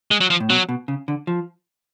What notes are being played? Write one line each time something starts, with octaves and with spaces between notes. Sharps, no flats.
G#3
F#3
F3
A2
B2 F#3
B2
C#3
D3
F3